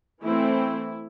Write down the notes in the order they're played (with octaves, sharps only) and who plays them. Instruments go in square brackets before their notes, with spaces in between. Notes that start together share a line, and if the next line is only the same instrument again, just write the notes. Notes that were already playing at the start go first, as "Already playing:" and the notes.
[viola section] E3 A3 C4 E4